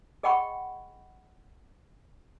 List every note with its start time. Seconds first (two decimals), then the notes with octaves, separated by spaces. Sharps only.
0.23 G#4 D#5 F#5 G5 B5 C#6